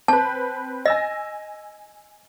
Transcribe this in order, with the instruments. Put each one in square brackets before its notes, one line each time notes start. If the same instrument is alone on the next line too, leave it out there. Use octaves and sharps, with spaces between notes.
[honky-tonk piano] C4 B4 [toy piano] A5
[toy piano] D#5 [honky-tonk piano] G#5 E6 A#6